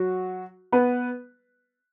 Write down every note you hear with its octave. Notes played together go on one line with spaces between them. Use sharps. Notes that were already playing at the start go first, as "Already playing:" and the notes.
Already playing: F#3 F#4
B3 B4